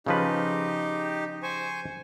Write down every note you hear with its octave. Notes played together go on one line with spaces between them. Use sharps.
C#3 F3 D#4 G4 B4
C5 G#5 C#6